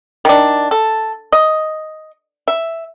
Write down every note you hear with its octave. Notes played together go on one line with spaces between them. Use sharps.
D#3 D4
A4
D#5
E5